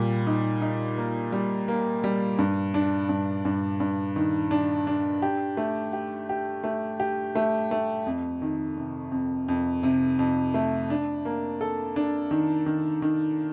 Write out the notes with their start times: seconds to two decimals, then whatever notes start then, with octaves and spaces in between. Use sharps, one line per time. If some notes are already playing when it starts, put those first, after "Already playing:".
Already playing: A#2 G3
0.27 D#4
0.62 D#4
0.98 A#3
1.32 G3
1.68 A#3
2.04 G3
2.39 G2
2.74 D4
3.09 G2
3.45 G2
3.80 G2
4.16 D#3
4.51 D4
4.87 D4
5.22 G4
5.57 A3
5.93 G4
6.29 G4
6.64 A3
7.00 G4
7.35 A3
7.71 A3
8.06 F2
8.42 D#3
8.78 C3
9.12 F2
9.48 F2
9.83 C3
10.19 F2
10.54 A3
10.90 D4
11.25 A#3
11.61 A4
11.96 D4
12.31 D#3
12.66 D#3
13.02 D#3